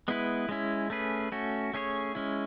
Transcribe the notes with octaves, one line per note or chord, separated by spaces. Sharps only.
G#3 B3 E4 B4
G#3 C#4 E4
A3 C#4 G#4 B4
A3 C#4 F#4
A3 C#4 G#4 C#5
G#3 C#4 E4